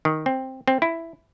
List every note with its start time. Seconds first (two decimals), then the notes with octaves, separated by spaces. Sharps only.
0.05 D#3
0.26 C4
0.68 C4
0.82 E4